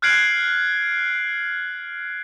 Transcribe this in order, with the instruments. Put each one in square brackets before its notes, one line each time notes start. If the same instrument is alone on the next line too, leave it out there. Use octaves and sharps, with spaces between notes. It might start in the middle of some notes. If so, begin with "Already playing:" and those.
[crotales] F6 F#6 G#6 C7 D7 F#7